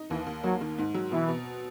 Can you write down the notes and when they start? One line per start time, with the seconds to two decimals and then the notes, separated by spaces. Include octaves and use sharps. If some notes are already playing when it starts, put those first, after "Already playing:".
Already playing: D#4
0.10 D#2 E3
0.26 D#2
0.44 F#3 A#3
0.61 D#3
0.78 G#2
0.94 F#3
1.11 B2 E3
1.28 B2